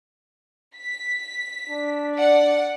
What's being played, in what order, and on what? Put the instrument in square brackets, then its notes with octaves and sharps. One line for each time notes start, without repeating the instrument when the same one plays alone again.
[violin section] B6
[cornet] D4
[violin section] D5 F#5